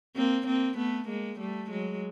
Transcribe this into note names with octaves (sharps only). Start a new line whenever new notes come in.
A#3 C4
A#3 C4
A3 B3
G#3 A#3
G3 A3
F#3 G#3